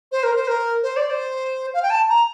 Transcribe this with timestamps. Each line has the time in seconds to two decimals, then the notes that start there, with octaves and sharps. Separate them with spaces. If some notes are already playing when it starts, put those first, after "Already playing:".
0.12 C5
0.23 A#4
0.36 C5
0.48 A#4
0.83 C5
0.97 D5
1.10 C5
1.74 F5
1.83 G5
1.90 A5
2.09 A#5